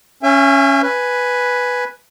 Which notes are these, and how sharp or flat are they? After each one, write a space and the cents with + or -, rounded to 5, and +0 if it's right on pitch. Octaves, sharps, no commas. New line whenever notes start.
C#4 +0 E5 +30 G#5 -40
B4 +0 G#5 +0